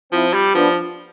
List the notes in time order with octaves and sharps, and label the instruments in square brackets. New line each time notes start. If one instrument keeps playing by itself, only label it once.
[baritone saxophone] F3 [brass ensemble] C4 E4
[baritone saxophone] G3
[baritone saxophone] F3 [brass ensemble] B3 D4